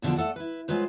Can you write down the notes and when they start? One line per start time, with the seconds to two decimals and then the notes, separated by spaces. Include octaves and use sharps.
0.02 E2 B2 D3 E3 F3 D4
0.16 A3 A4 D5 F#5
0.36 E4 B4
0.68 F#3 G#3 F4 B4 C5